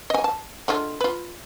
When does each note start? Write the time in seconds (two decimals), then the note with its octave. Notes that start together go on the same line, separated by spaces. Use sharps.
0.10 D#5 G#5
0.24 A5
0.68 D3 G#3 F4
1.01 F4 B4